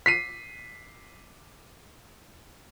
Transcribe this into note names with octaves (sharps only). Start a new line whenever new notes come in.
B6 C7 D#7